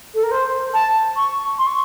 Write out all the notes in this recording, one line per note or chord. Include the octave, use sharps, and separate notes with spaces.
A4
A#4
C5
A5
C#6
C6
C#6